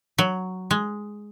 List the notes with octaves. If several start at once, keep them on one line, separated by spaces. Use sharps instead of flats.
F#3
G#3